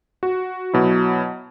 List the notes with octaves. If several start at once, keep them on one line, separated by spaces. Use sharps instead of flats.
F#4
B2 F#3 E4